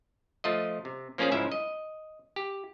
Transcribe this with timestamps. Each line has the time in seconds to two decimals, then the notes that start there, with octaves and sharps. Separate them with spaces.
0.44 F3 A3 F4 D#5
0.85 C3
1.18 F3 A#3 C#4 F4 G#4 C5
1.32 C#2 G#2 F3 E4 E5
1.52 D#5
2.36 G4